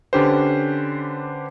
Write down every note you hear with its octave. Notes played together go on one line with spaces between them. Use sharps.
D3 C#4 D4 G4 B4 C5